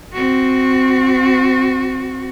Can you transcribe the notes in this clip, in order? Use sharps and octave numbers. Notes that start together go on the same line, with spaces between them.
C4 F#4